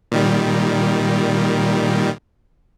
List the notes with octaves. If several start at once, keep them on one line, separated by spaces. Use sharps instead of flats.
A#2 D#3 G3